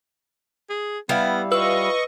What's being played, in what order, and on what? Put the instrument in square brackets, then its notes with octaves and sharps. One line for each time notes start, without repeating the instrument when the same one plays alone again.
[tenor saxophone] G#4
[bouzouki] G3 E4 F5 [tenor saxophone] B3
[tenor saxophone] F4 [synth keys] B4 E6 [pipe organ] D#5 C#6